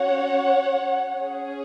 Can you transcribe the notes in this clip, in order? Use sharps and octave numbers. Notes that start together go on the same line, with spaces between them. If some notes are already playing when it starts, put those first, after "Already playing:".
Already playing: C#4 F#4 C#5 F#5
C#4 G#4